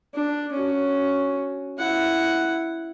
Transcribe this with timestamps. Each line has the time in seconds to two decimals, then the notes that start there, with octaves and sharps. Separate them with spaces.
0.14 D4
0.52 C#4 F#4
1.79 E4 F#5